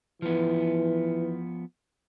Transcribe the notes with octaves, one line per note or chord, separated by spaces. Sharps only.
E3 F3 B3